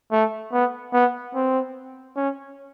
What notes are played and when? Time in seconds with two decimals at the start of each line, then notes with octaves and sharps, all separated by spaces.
0.12 A3
0.53 B3
0.93 B3
1.35 C4
2.16 C#4